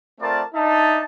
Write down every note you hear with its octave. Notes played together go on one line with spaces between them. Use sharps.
A3 C4 F4 A#4 D5 A5
D4 D#4 E5 A5